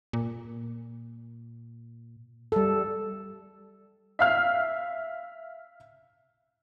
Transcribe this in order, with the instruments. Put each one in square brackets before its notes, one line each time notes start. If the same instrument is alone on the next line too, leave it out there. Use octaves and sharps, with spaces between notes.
[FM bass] A#2
[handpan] G3 A4
[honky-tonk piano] E5 F5 F6